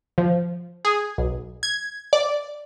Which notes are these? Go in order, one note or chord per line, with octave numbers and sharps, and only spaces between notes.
F3
G#4
B1
G#6
D5